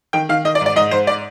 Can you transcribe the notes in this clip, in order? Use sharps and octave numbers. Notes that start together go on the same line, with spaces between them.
D#3 G5
D#3 F5
D#3 D#5
D5
G#2
D5
G#2 D#5
G#2 C5
D5